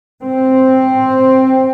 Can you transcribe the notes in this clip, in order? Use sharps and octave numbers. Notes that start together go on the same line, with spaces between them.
C4